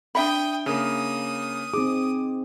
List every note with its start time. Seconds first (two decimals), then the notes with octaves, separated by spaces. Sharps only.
0.15 D4 E5 G5 B5 D#6
0.66 C#3 A#3 D#6
1.74 C4 D#4 G#4 D6